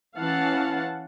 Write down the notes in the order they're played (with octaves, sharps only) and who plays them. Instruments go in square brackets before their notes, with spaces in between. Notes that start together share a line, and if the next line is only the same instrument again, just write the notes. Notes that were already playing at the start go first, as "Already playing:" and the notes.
[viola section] E3 C#4 F5 F#5 A5